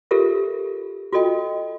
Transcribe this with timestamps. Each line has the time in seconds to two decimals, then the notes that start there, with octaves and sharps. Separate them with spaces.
0.11 F4 G4 A4 A#4 E5
1.13 F4 F#4 A4 D#5 G5